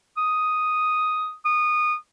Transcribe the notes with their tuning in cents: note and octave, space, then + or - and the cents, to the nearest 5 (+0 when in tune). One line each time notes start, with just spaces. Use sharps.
D#6 +0
D#6 -20